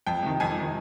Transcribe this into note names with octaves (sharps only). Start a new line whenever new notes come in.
F2 G5
C3 D#3
F2 G#5
C3 D#3